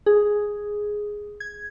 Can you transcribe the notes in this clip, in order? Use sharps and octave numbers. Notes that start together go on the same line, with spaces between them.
G#4
G#6